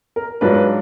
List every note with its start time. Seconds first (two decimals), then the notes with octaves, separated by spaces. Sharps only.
0.16 A#4
0.41 G#2 F#3 D4 F4 B4
0.54 B4